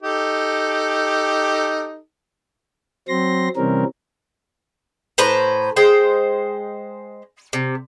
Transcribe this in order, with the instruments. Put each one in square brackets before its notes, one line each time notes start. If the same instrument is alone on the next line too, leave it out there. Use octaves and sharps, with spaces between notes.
[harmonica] D#4 G4 A4
[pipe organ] F#3 C4 C6 A#6
C3 E3 G3 C4 C#4 A#4
[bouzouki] A2 B4 C5 A#5
G#3 C5 G5
C3